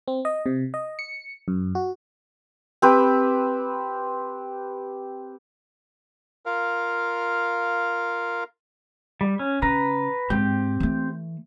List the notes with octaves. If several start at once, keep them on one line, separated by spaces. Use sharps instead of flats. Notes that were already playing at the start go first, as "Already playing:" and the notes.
C4
D#5
C3
D#5
C#7
F#2
F#4
C4 G4 B4
F4 A#4 F5
G3
C#4
C#3 B4 A#5
G#2 C4 G4
E3 A3